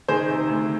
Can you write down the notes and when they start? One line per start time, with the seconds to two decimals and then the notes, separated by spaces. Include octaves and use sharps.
0.08 D#3 G#4 C5
0.29 C3
0.48 D2